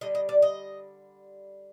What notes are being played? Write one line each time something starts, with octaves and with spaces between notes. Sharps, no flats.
D3 G3 D#5
D#5
D5
D#5